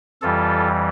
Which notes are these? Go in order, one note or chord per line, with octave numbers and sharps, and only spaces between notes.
F2 E3 G3 F4 A4